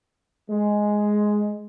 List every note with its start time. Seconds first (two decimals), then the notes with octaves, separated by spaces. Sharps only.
0.50 G#3